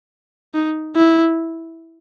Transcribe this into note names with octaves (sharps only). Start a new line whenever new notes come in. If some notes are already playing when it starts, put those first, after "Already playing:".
D#4
E4